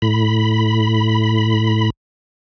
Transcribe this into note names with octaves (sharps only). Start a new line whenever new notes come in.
A2 B5